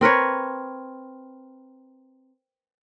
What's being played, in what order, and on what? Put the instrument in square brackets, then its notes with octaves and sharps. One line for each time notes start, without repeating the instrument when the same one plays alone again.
[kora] C4 A#4 B4 C#5